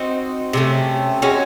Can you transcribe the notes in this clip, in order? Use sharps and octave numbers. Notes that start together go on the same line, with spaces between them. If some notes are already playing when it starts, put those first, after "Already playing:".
Already playing: C4 D#4 F#4 C5
C3 F#3 A3 C#4
G#3 C#4 F#4 C#5